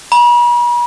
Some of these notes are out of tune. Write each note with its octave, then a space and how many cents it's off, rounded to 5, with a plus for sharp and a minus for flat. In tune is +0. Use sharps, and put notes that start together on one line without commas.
B5 -45